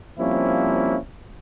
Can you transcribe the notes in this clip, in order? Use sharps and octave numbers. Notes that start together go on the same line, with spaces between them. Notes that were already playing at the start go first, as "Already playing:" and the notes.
F3 G3 A#3 C4 C#4 E4